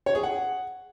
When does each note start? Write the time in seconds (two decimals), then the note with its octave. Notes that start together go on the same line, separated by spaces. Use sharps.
0.06 C#5
0.15 G#4
0.23 F#5